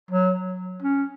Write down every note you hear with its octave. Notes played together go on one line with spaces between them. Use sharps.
F#3
C#4